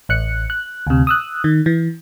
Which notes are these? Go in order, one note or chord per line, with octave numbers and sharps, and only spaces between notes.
A1 F#6 C#7
F#6
D2 C3
D#6 E6 F#6
D#3
E3